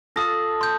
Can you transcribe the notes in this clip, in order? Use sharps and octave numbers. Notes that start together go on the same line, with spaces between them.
F4 A4 A5 D#6 A#6
C6 G6